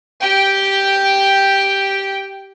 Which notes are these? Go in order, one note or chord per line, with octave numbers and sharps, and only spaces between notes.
G4 G5